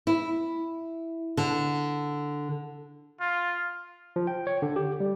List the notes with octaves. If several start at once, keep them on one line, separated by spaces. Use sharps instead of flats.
E4
D3
F4
F3
G5
C#5
D3
G4
G3